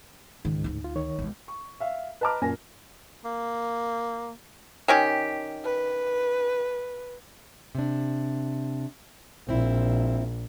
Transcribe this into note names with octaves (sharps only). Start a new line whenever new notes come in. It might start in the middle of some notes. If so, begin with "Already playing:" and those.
C#2 G#2 D#3
D2 D#4
F4
D#3 C#5
B1 G#3
C#6
E5 F5
B4 D#5 A5 A#5 D6 F6
F#2 A#2 A#3 G#5 A#6
A#3
D#3 C#4 G4
B4
C3 D4
A#1 C4 E4